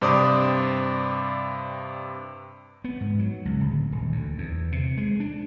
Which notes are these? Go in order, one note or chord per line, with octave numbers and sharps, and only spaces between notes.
G2 C3 C5 D5 D6 D#6
B3
G#2
F#3
C#2
D1
D#1
D2
E2
C3
G#3
D4